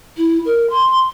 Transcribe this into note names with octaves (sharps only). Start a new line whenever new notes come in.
E4
A#4
C6